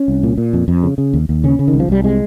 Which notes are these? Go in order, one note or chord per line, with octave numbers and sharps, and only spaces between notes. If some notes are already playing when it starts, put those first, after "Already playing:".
Already playing: C#4
C2
A#2
A#2
F2
F2
C#3
C#3
D#2
D#2
C#3 C#4
C#3
D#3
C2
F3
C2 G3
C3 G#3